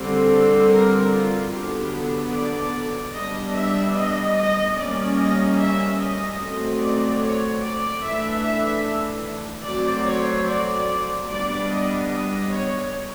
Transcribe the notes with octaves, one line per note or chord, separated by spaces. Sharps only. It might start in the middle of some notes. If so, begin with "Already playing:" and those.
Already playing: D3 G3 C4
A4
A#4
F4
D3 F#3 B3 D4 G4
D5
G3 B3 D4 D#5
E5
D#5
D#5
G3 A#3 C#4 D5
D#5
E5
D#5
F#3 A3 C4
D5
C#5
D5
E3 A3 D4 E5
E5
F#3 A3 C4 D5
C#5
D5
G3 B3 D4 D5
D#5
D#5
C#5